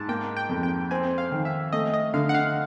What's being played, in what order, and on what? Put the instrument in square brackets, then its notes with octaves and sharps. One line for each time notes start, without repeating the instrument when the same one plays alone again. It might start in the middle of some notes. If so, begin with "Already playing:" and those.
Already playing: [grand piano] G#2 [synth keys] A5
[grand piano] A#3 [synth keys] G5
[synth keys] G5
[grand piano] F2
[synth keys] G5
[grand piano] C4 [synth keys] G#5
[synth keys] F5
[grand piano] D#3
[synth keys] E5
[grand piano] A3 [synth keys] D#5
[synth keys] D#5
[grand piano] D3 [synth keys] F5
[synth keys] F#5
F5